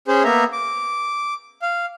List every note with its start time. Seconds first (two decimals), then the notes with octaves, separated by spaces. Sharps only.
0.08 C#4 G#4 C5
0.24 A#3 B3 E5 A#5
0.53 D6
1.62 F5